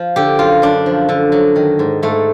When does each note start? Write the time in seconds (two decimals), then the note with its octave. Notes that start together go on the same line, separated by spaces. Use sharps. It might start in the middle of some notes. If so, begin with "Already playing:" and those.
Already playing: F3
0.16 D3 G4
0.39 F#2 F4
0.62 F#2 D4
0.86 F3
1.09 D3
1.32 F#3
1.56 D#3
1.79 G#2
2.03 G#2 A3